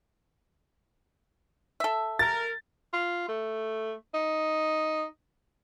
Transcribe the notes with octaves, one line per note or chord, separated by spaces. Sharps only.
A4 E5
A#4 A6
F4
A3
D#4